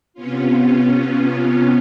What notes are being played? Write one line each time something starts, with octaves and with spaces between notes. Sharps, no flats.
C3 B3 C#4 F4